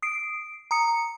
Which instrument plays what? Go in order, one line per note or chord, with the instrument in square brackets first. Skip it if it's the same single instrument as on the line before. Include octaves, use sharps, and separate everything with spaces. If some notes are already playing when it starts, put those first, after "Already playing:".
[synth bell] D#6 C7 D7
A#5 D#6 C#7